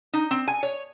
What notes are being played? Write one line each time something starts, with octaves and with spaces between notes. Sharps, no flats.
D#4
C4
G#5
C#5